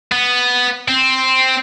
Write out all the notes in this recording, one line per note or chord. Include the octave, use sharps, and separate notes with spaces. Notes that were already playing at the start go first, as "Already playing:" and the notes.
B3
C4